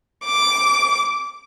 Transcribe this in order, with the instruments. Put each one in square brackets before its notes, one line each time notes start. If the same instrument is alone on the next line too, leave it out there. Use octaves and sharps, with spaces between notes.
[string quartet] D6